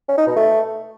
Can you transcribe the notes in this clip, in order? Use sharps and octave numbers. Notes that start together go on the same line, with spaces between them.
C#4
D#4
B2
A3